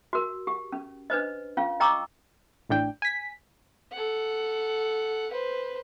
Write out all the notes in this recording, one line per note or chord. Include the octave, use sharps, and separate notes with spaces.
F#4 A#4
G4
C#4
D4 B4 C5 D#5
C#4 F4 F5
D#5 G5 A#5 C#6 D6 E6
A1 A2 D4 G5
G#5 B6
A4 F#5
B4 C5